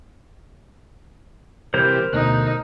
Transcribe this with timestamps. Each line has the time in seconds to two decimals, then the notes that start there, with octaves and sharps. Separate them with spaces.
1.74 C3 E3 G3 A#4 C5 G6
2.13 D2 B2 A3 D#4 F#6